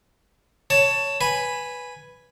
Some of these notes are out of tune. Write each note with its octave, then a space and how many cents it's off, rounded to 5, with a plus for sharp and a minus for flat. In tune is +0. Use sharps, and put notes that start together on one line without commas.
C#5 +10 A5 +10
B4 +0 G#5 +0 B5 +0